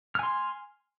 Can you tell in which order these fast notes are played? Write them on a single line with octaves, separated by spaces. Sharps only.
F6 G#5 C6